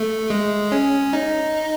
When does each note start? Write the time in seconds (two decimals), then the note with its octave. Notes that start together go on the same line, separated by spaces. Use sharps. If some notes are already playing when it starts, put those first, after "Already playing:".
Already playing: A3
0.30 G#3
0.72 C#4
1.13 D#4